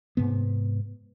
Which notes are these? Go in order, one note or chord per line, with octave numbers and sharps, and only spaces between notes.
G#2 C3 B3